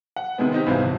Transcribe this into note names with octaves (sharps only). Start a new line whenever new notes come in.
F#5
C3 D#3 G#3 B3
C4 D#4 G4
C2 G#2 C3 E3 C5 F5
D1